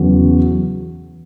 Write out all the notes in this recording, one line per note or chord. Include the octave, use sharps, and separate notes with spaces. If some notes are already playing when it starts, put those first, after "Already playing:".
Already playing: E2 C#3 F#3